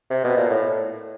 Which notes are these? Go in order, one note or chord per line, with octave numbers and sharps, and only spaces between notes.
C3
B2
A#2
A2